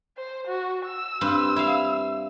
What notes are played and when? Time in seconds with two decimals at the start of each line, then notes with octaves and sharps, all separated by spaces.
0.17 C5
0.48 F#4
0.86 E6
1.21 G2 C4 B4
1.56 E4 E5 F5